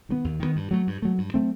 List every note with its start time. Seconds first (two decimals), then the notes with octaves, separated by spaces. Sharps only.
0.09 D#3 F#3 B3
0.24 D#2
0.40 D#3 F#3 B3
0.56 G2
0.71 F#3 A3
0.87 G2
1.02 F#3 A3
1.18 G2
1.34 F#3 A3 C4